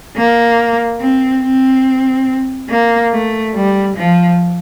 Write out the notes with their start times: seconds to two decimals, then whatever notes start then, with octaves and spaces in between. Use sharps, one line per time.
0.17 A#3
1.00 C4
1.43 C4
2.70 A#3
3.13 A3
3.55 G3
3.96 F3